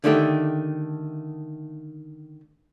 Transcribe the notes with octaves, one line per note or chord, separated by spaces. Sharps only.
D3 D#3 A3 G4